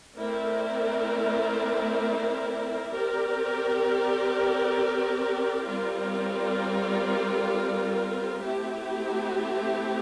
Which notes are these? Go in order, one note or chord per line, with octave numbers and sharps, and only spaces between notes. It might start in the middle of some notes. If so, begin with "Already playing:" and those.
A3 C4 E4 A#4 D5
C4 G4 A#4 D5
G3 C4 F4 A#4 D5
A3 C4 E4 G4